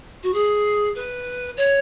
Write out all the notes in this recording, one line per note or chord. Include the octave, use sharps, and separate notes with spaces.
F#4
G#4
B4
C#5